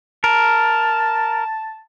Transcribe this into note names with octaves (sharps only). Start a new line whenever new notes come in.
A#4 A5